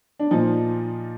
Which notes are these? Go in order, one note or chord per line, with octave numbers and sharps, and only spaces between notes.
D4
A#2 F3 D#4